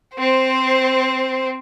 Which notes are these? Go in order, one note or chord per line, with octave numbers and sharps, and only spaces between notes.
C4 C5